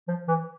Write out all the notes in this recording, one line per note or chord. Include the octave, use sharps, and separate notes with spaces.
F3
E3